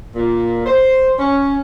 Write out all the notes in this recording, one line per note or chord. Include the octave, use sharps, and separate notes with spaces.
A#2
C5
C#4